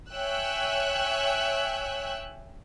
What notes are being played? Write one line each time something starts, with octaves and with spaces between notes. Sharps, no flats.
C#5 E5 G5 G#5 E6 F#6